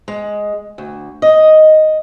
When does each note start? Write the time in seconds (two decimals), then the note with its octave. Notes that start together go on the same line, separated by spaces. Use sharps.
0.08 G#3
0.78 D2
1.22 D#5